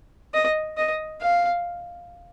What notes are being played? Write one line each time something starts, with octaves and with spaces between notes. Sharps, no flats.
D#5
D#5
F5